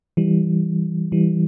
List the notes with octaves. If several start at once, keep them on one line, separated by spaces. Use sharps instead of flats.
E3 G3
E3 G3